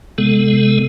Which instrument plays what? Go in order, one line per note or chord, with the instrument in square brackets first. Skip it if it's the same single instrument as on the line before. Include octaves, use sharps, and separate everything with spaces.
[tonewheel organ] C3 G#3 B3 A4